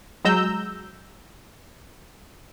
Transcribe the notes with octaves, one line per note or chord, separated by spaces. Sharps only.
F#3 G#3 A#5 E6 G6